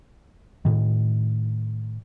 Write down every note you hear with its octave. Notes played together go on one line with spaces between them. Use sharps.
A2 D#3